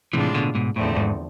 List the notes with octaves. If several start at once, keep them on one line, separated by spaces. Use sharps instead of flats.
A2 C3 E3 G#3 D4 F4
B2 D3
G#2 B2
E2 A2 D3 F3 A3 C4
G#2